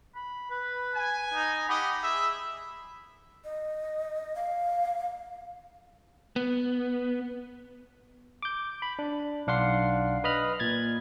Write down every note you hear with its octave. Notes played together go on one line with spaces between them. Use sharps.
B5
B4
G#5
D#4
G4 D#5 F#5 B5
G#4 E5
D#5
F5
B3
D6 G6
B5
D4
B1 D4 F5 F#5 C6 C7
B4 D#5 B5 F6
A#2 G#6 A6